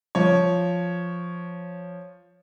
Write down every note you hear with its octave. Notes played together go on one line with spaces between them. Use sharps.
F3 C#5